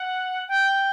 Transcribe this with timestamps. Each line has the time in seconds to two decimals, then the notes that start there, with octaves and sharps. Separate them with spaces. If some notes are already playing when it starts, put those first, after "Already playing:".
Already playing: F#5
0.48 G5